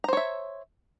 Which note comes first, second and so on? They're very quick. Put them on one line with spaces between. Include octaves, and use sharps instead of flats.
A#5 C5 C#5 E5